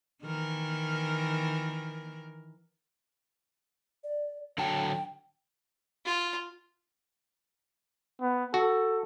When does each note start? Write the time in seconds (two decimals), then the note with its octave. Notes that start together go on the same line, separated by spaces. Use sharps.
0.22 D#3 E3 A#4
4.04 D5
4.58 D3 F#3 G5 A5
6.05 F4
8.21 B3
8.54 F#4 A4